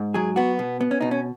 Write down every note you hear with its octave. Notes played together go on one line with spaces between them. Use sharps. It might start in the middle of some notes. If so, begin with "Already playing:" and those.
Already playing: G#2
F#3 G#4
B3 F#4
B2
B3
C#4
B2 D#4
C#4